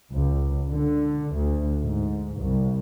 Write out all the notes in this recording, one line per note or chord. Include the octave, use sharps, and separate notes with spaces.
C#2
D3
D2
G#2
C2